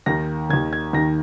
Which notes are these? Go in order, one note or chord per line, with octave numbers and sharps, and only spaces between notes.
D#2 D#3 A#6
D#2 D#3 G#6
G#6
D#2 D#3 A#6